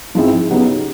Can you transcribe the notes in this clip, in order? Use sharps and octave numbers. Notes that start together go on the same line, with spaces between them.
G#2 F3 G#3 C4 E4
C#3 F#3 B3 D#4 G4